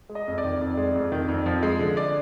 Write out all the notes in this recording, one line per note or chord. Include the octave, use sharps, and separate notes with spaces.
G#3
D#5
F2
D5
D#3
F2
G#3
F2
D#3
F2
F3
G#3
D3
D5